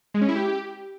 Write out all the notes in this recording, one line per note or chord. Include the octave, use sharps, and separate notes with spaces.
G#3
C#4
E4
G4